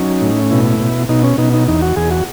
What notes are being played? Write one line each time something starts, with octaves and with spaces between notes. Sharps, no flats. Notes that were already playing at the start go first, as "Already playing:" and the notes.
Already playing: F#3 C#4 D#4
A2
B2 E4
B2
B2 D#4
C#4
B2 D#4
D#4
E2 D#4
F#4
E2 G#4
F#4